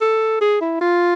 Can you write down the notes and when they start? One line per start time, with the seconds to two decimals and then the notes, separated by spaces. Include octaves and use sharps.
0.01 A4
0.41 G#4
0.61 E4
0.81 F4